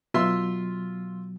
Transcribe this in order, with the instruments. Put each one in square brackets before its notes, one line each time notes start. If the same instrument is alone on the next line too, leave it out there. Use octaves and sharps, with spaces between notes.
[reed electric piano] B2 F#3 [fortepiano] F4 E5 C6